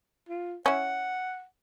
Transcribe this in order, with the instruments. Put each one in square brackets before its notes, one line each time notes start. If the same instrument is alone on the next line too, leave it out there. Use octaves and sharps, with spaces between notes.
[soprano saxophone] F4
[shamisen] C#4 E4 [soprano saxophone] F#5